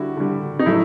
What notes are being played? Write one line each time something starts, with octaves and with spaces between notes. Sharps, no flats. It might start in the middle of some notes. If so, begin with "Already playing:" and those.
Already playing: D3 G3 E4 F#4
D3 G3
D#4
A2 F#3 A3 E4